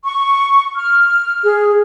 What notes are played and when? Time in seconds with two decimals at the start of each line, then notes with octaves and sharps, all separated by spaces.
0.05 C#6
0.76 F6
1.44 G#4